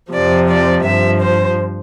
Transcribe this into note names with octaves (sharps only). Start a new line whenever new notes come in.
F2 C3 F3 D5
D5
G2 F3 E5
C5